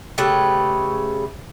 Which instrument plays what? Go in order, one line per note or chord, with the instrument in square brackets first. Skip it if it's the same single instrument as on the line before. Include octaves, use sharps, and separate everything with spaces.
[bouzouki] C#3 A3 G4 B4